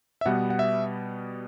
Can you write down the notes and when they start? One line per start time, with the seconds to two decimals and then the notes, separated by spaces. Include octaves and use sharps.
0.21 E5
0.26 B2 G3 B3 F#5
0.50 F#5
0.59 E5